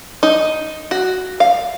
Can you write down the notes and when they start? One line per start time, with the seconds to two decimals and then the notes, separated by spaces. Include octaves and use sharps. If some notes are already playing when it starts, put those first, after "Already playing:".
0.23 D#4
0.91 F#4
1.40 F5